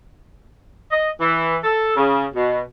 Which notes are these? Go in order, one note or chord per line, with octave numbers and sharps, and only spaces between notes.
D#5
E3
A4
C#3
B2